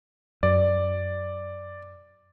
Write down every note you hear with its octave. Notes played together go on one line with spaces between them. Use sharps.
F#2 D5